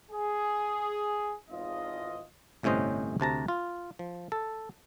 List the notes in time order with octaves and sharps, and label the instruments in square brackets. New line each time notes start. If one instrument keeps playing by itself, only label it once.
[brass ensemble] G#4
G#1 E2 F4 D#5
[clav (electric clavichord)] G1 A2 C3 C#4 C5 D#5
D2 C3 A5 A#5
F4
F3
A4